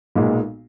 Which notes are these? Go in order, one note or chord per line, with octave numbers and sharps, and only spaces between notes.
B1 A#2 G#3 B3